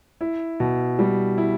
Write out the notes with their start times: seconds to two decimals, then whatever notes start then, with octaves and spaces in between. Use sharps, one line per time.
0.21 E4
0.60 B2
0.99 G3
1.38 E4